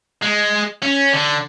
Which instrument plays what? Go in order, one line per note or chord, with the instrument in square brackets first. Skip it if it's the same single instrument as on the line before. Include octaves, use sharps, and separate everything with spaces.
[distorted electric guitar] G#3
C#4
D3